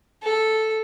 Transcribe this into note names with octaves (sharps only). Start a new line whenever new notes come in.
A4